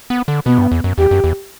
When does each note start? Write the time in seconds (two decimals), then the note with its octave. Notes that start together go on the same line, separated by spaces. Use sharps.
0.10 B3
0.28 D3
0.46 B2 B3
0.58 G2
0.71 E2
0.84 F#2
0.98 E2 G4
1.11 F#2
1.24 E2